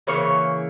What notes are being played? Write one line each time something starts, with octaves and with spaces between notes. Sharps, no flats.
C#3 E3 A#3 C#5